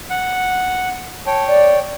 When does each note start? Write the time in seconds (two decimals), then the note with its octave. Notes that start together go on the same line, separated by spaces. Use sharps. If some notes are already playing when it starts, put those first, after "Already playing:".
0.10 F#5
1.26 C#5 G5 A5
1.47 D5